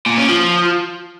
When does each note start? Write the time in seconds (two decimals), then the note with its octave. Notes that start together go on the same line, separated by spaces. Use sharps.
0.06 A#2
0.18 C#4
0.29 F3